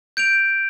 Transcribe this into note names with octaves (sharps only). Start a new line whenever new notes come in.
G6 D7 F7